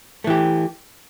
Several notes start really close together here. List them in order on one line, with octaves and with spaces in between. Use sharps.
A3 E3 G4